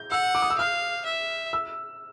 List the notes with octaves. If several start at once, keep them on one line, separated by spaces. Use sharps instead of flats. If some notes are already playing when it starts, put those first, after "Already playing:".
Already playing: G6
F#5 E6
D6
D#6
E6
F5 F6
E5
E6